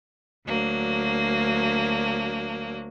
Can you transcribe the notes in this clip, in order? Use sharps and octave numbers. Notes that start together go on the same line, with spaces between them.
D2 F#3 A#3 D4